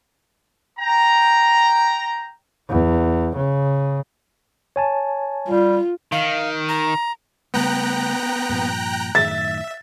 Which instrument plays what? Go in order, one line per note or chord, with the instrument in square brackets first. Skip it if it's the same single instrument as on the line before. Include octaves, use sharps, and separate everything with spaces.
[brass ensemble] G5 A#5
[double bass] E2
C#3
[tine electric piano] C#5 G#5 A5
[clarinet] G3 [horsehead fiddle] F4
[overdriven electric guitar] D#3 [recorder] F5
[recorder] A#5
[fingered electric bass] C#3 G3 A3 [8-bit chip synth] B3 [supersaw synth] G5 A#5 F#6
[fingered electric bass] G2 A#2 F3
[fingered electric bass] F#2 A2 D#3 [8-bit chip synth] E5 [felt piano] A6